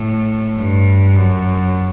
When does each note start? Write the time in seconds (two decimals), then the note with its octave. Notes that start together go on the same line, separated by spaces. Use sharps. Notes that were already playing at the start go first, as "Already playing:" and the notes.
Already playing: A2
0.58 G2
1.16 F#2